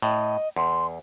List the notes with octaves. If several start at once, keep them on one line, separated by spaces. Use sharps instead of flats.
A2 D#5
E2 C6